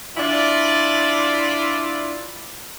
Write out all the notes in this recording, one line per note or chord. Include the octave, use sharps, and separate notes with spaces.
D4 E4 F4 D5